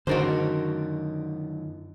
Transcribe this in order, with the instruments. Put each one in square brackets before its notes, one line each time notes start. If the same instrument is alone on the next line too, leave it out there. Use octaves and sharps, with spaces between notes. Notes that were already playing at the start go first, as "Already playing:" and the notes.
[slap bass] F#2 D#3 [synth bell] D3 D4 D#5 [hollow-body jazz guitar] F#4 A#4 C5